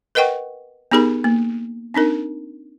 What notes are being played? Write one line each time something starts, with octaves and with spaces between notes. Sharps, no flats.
A#4 B4 D#5 F#5 G5 C#6
B3 D#4 G4 G#4 A#4 B5
A#3
C4 D4 D#4 A#4